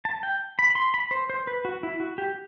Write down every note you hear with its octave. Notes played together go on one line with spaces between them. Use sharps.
A5
G5
B5
B5
C6
B5
C5
C5
B4
F#4
E4
F#4
G4